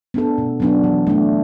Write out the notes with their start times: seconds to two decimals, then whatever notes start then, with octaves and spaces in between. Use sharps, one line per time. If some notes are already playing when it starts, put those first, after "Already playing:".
0.14 B3 D4 A4
0.38 B2
0.60 F#3 B3 D4
0.84 E3
1.07 A3 D4